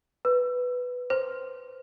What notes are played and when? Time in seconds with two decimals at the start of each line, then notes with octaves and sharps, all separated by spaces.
0.25 B4
1.10 C5